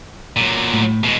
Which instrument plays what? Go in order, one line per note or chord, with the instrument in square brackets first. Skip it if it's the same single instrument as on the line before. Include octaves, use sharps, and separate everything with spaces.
[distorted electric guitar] A#2 F#3
[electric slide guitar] A2
[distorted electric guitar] B2 G#3